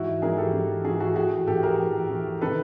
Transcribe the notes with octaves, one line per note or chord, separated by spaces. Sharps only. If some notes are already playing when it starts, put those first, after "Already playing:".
Already playing: G#2 E3 E4 F#4
G#2 E3 G#4 A#4
G4 A4
G#2 E3
G#2 E3 F#4 G#4
F#4 G#4
A2 E3 F#4 G#4
A2 E3 G4 A4
G#4 A#4
A2 E3
A2 E3
C3 D#3 A4 B4